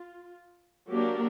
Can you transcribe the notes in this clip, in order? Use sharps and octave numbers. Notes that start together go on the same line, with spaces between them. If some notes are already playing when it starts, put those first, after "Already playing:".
Already playing: F4
F#3 A#3 D4 G4